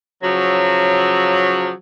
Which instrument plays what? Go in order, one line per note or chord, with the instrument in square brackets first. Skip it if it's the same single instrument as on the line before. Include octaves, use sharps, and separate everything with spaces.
[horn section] C#3 F3 F#3